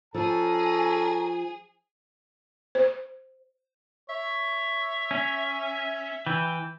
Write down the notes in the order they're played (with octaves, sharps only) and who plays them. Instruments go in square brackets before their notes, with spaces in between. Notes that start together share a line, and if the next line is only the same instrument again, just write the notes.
[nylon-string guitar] F3 [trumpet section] C#4 A5 A#5 [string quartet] G#4 [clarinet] A4
[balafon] C5
[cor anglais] C#5 [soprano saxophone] E5
[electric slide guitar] C#4
[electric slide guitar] E3 [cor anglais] G5